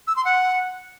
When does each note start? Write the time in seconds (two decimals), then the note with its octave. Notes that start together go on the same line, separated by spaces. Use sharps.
0.07 E6
0.16 C6
0.25 F#5